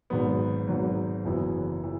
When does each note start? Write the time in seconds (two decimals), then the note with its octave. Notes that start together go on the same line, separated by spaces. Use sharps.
0.10 G#1 G#2 F#3 B3
0.68 G#1 G#2 F#3 B3
1.25 F#1 F#2 E3 B3
1.84 E3